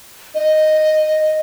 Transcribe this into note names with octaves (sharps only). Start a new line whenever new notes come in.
D#5